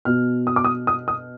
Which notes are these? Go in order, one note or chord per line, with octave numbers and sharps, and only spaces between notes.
B2 F6
D#6
D6
D#6
D#6
D#6